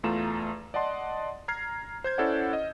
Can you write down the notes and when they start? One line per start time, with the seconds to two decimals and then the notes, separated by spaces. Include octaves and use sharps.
0.04 E2 A3 F4 A#5 E7
0.74 D5 D#5 F#5 A5 C6
1.48 A#5 F6 G#6 C7
2.04 C5 G6 G#6
2.18 C#4 E4 A4 C5 D5 F#5
2.53 D#5